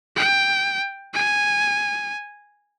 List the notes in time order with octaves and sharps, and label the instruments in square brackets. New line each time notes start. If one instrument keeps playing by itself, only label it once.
[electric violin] G5
G#5